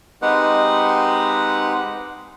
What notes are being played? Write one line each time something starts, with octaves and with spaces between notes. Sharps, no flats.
G#3 C4 D#4 G4 B4 F#5